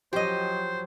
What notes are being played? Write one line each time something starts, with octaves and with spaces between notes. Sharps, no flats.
F3 F#3 C#4 G4 C5 D#5